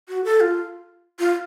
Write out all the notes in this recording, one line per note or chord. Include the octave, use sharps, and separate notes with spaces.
F#4
A4
F4
F4